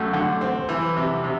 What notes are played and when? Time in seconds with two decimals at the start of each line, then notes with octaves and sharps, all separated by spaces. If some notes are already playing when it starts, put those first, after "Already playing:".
Already playing: F#2 A3
0.13 D3
0.41 C4
0.69 E3
0.97 C3
1.24 C3